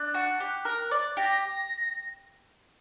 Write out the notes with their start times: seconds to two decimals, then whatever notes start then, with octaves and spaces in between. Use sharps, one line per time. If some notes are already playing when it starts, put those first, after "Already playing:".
Already playing: D4 F#6
0.14 F#4
0.40 G4
0.65 A#4
0.91 D5
1.17 G4 A#6